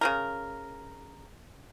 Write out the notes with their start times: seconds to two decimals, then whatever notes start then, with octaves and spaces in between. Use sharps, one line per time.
0.01 C#3 F3 A#4